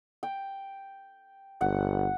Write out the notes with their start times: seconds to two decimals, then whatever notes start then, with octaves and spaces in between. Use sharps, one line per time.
0.23 G5
1.61 G1 F#5